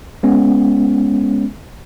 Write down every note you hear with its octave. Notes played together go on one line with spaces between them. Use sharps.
G#3 B3 C#4